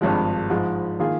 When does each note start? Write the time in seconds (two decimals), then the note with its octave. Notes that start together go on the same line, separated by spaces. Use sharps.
0.01 G#1 G2 F3 G#3
0.50 G#2 F3 G#3
0.99 D#3 A#3 F4 G#4